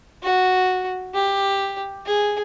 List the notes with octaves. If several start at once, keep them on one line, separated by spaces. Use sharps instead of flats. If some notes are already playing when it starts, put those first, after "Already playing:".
F#4
G4
G#4